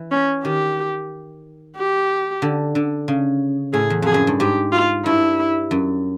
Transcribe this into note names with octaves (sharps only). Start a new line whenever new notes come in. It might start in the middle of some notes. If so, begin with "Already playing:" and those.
Already playing: E3
C#4
D#3 G4
G4
D3
D3
C#3
A2 G#4
E2
F2 G#4
F#2
G2
G#2 G4
F4
G2 E4
F#2